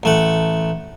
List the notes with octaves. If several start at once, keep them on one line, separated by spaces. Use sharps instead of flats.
A1 A3 F#5